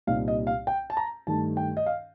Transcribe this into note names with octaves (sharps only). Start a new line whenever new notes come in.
C2 A#2 G3 C4 D#4 F5
D#5
F5
G5
A5
A#5
G2 D#3 A3 D#4 A5
G5
D#5
F5